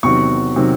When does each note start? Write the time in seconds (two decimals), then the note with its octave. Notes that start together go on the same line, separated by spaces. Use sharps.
0.03 E2 C3 D#3 F#3 C#6
0.56 C3 D#3 F#3